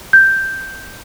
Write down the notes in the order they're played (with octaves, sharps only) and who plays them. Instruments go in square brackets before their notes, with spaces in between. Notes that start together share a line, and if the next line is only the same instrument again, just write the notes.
[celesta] G6